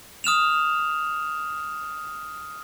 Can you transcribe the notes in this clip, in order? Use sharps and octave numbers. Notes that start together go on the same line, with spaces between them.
D#6 F6 E7 F7